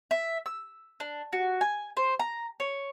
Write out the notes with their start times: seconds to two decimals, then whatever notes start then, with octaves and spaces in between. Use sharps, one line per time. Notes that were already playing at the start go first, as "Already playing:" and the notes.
0.11 E5
0.46 E6
1.00 D4
1.33 F#4
1.61 G#5
1.97 C5
2.20 A#5
2.60 C#5